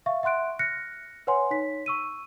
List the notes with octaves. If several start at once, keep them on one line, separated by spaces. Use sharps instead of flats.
E5 F5 C#6
E5 F#5 C6 F#6 D7
F6 F#6 A#6 C#7
B4 C#5 F#5 G#5 C6
D#4 C#5 B6
C#6 E6 D#7